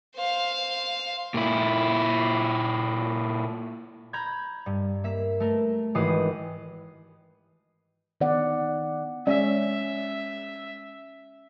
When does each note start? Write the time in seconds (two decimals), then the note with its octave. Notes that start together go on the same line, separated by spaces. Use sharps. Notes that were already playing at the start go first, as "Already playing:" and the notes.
0.17 C5 F5
1.34 A#2 E4
4.13 A#5 B5 F6 G6 G#6
4.66 G2
5.04 A#3 E5 B6
5.40 A3 A#4
5.95 G#1 E3 G4 B4 D#6 C7
8.21 D#3 B3 D5 F#5
9.27 G#3 C#4 D5 E5